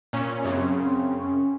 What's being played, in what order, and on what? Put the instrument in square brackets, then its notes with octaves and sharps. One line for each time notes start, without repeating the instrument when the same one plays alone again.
[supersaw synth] A#2 C#4
[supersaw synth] F#2 C#3 [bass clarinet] C4
[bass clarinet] C4
C#4